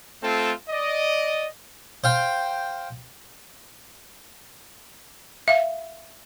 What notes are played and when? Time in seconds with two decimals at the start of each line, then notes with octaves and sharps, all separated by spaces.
0.23 A3 C4 F4 A4
0.69 D5 D#5
2.04 C5 F5 G5
5.48 E5 F5